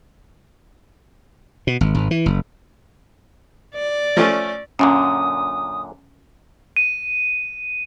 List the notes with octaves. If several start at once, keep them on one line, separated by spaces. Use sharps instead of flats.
B2
G#1
G#1
E3
F#1
D5
F3 A3 C#4
F#2 A#2 D3 C#4 D#6
D#7